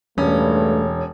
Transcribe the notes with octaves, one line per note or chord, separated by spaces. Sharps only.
E1 G2 A3 C#4